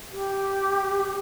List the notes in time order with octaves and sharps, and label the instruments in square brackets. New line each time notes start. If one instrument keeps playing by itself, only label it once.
[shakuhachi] G4